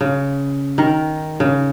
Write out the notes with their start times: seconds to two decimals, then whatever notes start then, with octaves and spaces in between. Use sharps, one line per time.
0.01 C#3
0.78 D#3 A#4
1.40 C#3